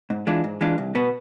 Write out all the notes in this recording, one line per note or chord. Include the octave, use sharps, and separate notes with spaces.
G#2
E3 G#3 D4 F4
G#2
E3 G#3 D4 F4
C2
B2 B3